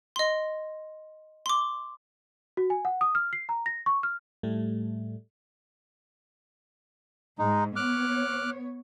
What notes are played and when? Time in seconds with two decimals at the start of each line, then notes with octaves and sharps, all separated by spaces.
0.16 D#5 C6
1.46 C6 D6
2.57 F#4
2.70 G#5
2.85 F#5
3.01 D#6
3.15 F6
3.33 C7
3.49 A#5
3.66 A#6
3.86 C#6
4.03 F6
4.43 A2 G3 A3
7.39 G#2 G#3 D#4
7.76 B3 C#5 D6 F6 F#6